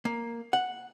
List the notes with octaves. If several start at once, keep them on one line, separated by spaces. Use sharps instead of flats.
A#3
F#5